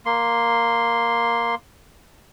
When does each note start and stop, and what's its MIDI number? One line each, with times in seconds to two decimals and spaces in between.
0.06 1.55 58
0.06 1.55 84